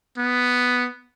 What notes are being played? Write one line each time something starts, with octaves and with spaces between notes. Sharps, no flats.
B3